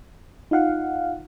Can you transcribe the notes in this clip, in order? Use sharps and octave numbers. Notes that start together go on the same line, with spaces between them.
D#4 F4 F5 F#5